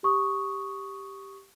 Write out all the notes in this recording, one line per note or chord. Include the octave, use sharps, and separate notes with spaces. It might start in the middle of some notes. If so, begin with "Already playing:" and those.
G4 C#6 D#6